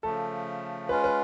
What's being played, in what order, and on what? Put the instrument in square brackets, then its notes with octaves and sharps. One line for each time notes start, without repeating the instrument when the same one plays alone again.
[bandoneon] C#3 F3 A3 [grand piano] A4
[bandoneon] G#3 C#4 F4 [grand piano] B4
[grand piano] B4